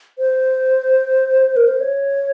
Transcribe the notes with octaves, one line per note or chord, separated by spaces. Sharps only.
C5
A#4
C5
C#5